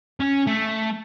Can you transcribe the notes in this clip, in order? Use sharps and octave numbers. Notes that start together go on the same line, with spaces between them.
C#4
A3